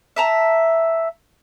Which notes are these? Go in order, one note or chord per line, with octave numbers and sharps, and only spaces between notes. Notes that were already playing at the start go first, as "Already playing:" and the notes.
E5 A5 A#5